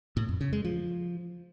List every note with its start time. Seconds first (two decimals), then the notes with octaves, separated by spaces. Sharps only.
0.17 A2
0.29 F2
0.41 C#3
0.53 G#3
0.65 F3